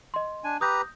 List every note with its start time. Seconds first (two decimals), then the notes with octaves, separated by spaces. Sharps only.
0.14 D#5 C6
0.44 D4 G#5
0.61 G4 B4 A#5 D#6 G6 A#6